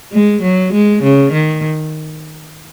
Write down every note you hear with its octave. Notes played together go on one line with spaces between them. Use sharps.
G#3
F#3
G#3
C#3
D#3